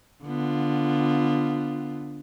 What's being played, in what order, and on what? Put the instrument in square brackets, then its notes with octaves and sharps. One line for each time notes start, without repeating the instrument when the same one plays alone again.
[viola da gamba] D3 B3 F4